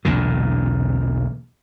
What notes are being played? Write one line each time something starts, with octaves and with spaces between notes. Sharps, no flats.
B1 E2 A#2 D3